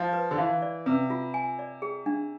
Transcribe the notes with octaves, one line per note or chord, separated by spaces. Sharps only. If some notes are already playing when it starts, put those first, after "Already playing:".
Already playing: F3 F5
B4
D3
E3 F5
D5
C3 B4
F4
G#5
D5
G#4
D4